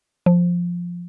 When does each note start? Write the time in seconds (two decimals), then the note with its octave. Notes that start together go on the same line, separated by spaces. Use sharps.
0.26 F3